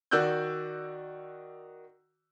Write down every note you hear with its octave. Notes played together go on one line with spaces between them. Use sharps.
D#3 F#4 D5 E6 F#6 G6